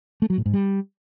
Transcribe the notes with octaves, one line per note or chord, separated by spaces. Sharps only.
A3
F#3
A2
G#2
G3